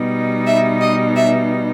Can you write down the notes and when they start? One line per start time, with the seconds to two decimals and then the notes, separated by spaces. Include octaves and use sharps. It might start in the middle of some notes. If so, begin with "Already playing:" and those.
Already playing: B2 G3 B3 D#4
0.46 E5
0.81 D#5
1.16 E5